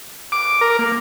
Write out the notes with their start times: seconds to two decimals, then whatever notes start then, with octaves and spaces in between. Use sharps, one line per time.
0.32 D6
0.61 A#4
0.79 A#3